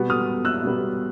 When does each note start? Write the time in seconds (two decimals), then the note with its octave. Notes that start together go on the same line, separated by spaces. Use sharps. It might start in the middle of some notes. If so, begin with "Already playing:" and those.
Already playing: B2 G3 B3
0.10 D#6 F6
0.45 E6 F#6
0.63 B2 G3 B3